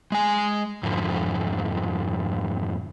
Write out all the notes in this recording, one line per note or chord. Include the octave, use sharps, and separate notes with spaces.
G#3 G#5
F2 G#2 D3